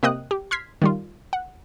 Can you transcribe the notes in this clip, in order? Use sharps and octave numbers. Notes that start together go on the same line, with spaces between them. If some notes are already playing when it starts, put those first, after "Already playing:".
C3 A#3 D#5 G5 D#6 F#6
G4
C6 F6 G#6 B6 C7
D#3 G3 F4
F#5